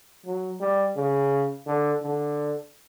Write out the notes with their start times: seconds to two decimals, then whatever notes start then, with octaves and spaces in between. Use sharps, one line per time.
0.26 F#3
0.61 G3
0.96 C#3
1.67 D3
2.02 D3